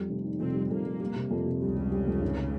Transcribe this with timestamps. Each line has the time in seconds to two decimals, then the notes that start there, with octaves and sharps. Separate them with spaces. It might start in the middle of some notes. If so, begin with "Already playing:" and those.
Already playing: F2 G3
0.09 F1
0.24 D#3
0.40 F2 C3 C4
0.54 G3
0.70 F2 A#2 A#3
0.85 G3
1.00 G3
1.16 C3
1.31 F2
1.46 C3
1.61 C#2 C#3 G3
1.77 G3
1.92 G3
2.07 F2
2.21 G#1